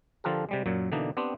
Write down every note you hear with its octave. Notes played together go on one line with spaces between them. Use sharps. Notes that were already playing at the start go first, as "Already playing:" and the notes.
D3 F3 F4 G4 A4 A#4
C3 G3 G#3
F#2 A#2 F#3
B2 D3 E3 A#3 D4 D#4
B3 C4 D4 G4 C5